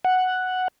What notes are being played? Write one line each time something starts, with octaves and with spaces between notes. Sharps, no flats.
F#5